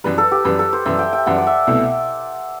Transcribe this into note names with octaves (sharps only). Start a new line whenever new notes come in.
F#2 E3 G3 B4
A4
G4
F#2 E3 G3 B4
A4
C5
F#2 E3 G3 E5
G5
G5
F#2 E3 G3 F#5
D5
E5
C2 B2 A3